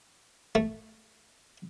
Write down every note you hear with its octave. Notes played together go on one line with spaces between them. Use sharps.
A3